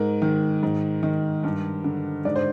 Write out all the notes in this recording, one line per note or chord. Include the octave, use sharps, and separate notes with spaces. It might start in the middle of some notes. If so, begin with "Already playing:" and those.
Already playing: G#2 A#4
D#3
G#2
D#3
G2
D3
G#2 D5
C5